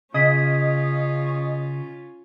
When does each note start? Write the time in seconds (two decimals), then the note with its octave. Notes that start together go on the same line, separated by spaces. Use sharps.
0.14 C#3 C#4 F4 D#5 D#6 G#6 B6